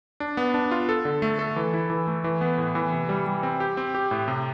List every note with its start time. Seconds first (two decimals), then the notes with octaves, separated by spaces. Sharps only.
0.20 D4
0.37 B3
0.54 D4
0.71 F4
0.89 A4
1.05 D3
1.22 A3
1.39 A4
1.56 E3
1.73 E4
1.90 E3
2.07 A3
2.24 E3
2.41 B3
2.58 A2
2.75 E3
2.92 C3
3.09 G3
3.27 G3
3.43 C4
3.60 G4
3.77 C4
3.95 G4
4.11 A2
4.28 C3